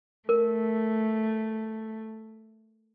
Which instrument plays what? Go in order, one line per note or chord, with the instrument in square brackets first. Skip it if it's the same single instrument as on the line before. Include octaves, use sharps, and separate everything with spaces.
[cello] A3 [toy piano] A#4